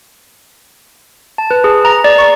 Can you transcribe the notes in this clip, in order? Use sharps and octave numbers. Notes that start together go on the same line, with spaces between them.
A5
B4
G#4
A#5
D5
C#6